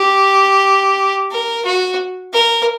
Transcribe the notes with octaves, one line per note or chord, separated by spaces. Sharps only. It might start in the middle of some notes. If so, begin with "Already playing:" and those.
Already playing: G4
A#4
F#4
A#4